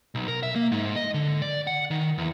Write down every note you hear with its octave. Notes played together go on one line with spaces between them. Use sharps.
B1
A#4
E5
A#3
G#2
D#5
D3
D5
F#5
D#3
E2